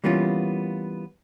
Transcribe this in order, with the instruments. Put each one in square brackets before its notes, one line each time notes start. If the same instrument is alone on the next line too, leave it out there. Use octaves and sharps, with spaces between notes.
[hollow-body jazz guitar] E3 G3 A#3 B3 C#4 F4